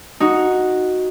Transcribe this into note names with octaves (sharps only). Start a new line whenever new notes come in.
D#4 F#4